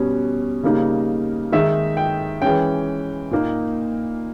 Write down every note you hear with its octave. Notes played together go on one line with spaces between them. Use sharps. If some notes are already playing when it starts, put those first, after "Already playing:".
Already playing: B2 G3 C#4
C#3 G3 A#3 D#4
D#3 G#3 D#4 E5
G5
E3 G#3 C#4 G5
A#2 A#3 D#4